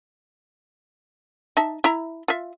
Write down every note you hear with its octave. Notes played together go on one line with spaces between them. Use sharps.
D#4 E5 A5
E4 E5 A#5
F4 E5